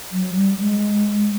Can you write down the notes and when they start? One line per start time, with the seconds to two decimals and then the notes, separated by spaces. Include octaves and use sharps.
0.12 F#3
0.35 G3
0.59 G#3